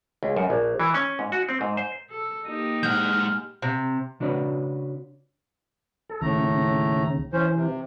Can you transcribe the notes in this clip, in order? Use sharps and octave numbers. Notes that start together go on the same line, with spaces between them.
C#2
F#2
A#1
E3
C#4
G#2
F#4
C4
G#2
C5
A4
A#3 D#4 G4 D#7
G#3 F#5 F6 G6
C3
C#3 D4 F#4 B4 C#5
A4
D#2 A2 C#3 A3 A#5
E3 C#4 C5
C3